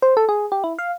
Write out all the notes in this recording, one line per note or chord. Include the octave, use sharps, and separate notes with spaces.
C5
A4
G#4
G4
E4
F5